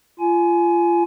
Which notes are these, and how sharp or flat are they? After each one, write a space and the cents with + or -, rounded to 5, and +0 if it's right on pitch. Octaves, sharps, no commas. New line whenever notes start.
F4 -25 G#5 +20